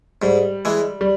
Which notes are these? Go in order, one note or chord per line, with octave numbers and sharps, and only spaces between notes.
G#2 G3
E3 G#3
G3